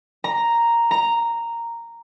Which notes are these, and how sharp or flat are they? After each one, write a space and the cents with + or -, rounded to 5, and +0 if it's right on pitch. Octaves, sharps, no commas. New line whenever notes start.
A#5 +0
A#5 -5